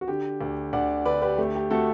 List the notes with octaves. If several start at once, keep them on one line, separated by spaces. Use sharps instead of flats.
F#4
D3 G4
D2
D2 D5 F#5
D3 B4 D5
G4 B4
A3 G4
G4
A3 F#4 A4